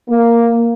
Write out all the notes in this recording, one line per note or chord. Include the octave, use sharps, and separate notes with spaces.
A#3